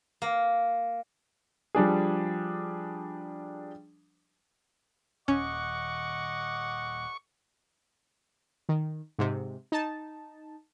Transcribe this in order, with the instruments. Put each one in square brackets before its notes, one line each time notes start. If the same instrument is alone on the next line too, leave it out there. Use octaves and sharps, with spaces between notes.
[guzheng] A#3
[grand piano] F3 G3 D4 G#4
[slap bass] D#1 D#2 [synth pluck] C#4 [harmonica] D#5 F#5 D6 [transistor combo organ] C#6
[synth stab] D#3
G#2 C3
D#4 A5